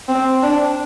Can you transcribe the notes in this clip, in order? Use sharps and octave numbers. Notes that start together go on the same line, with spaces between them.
C4
D4